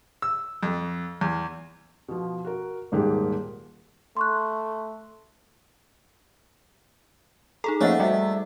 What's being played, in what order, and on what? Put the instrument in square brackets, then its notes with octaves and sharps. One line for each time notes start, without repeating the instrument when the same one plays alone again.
[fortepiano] E6
F2
E2
[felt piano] B2 F3
F#4 A#4
D#1 G#2 A#3 G4 G#4
[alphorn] A3 [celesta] C6 C#6 F#6
[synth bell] D#4 G#4 A4 [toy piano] A#5
[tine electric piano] F3 A#3 C#4 [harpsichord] A3 [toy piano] C#5 D#5 F#5
[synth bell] G3 F#4 [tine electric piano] D5 E5 [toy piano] G5